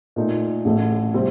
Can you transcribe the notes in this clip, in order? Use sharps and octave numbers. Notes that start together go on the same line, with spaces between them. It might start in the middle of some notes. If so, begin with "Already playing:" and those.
A#2 A3 D#4
A1 A2 A3
C3 G3 C4 G4